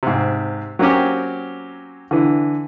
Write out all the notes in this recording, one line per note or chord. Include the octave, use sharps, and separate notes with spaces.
G#2 C3
F#3 A#3 C4 C#4 G4
D3 E3